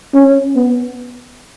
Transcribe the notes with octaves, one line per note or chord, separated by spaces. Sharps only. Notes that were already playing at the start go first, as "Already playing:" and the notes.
C#4
B3